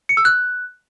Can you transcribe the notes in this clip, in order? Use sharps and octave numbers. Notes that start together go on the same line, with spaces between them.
C#7
E6
F#6